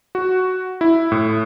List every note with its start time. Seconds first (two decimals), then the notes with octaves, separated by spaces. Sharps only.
0.15 F#4
0.81 E4
1.12 A2